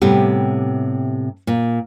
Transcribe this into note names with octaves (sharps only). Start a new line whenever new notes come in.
A2 C3 G3 B3 G4
A#2